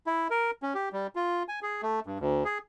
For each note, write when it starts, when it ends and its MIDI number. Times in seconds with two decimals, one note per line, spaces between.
0.07 0.28 64
0.30 0.51 70
0.63 0.74 61
0.75 0.89 67
0.92 1.07 55
1.16 1.43 65
1.48 1.60 80
1.63 1.82 68
1.83 2.00 57
2.07 2.18 43
2.20 2.44 38
2.45 2.58 68